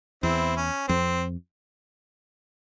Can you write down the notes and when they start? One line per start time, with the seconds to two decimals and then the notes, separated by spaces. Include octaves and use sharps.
0.23 E2 C4 E4
0.57 C#4
0.89 F2 C4